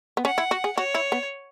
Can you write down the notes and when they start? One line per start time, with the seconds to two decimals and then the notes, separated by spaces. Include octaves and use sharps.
0.17 B3
0.25 C#4 F#5
0.38 E4
0.51 F#4
0.64 G#4
0.78 F#4 C#5
0.94 E4
1.12 B3